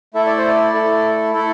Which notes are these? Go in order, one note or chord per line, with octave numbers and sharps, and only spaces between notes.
A3 E4 A4 E5
D5
C5
D5
A3 E4 A4
A3 E4 A4